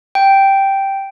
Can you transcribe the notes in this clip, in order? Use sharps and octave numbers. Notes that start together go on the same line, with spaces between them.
G5